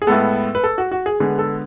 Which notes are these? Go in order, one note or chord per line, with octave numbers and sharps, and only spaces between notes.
G#4
A2 G#3 B3 A4
B4
A4
F#4
F#4
G#4
D3 G#3 B3 G#4
A4